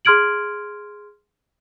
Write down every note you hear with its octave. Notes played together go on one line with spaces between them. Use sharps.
G#4 C6 F6 G#6 D7 F#7